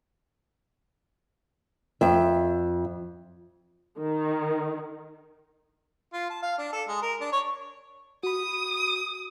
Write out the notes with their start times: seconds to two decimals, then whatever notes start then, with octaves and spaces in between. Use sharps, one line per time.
2.01 F2 E5
3.99 D#3
6.13 F4
6.30 A5
6.43 F5
6.58 D4
6.73 A4
6.88 G#3
7.02 A#4
7.21 D4
7.32 C#5
8.23 F#4 B5 D#6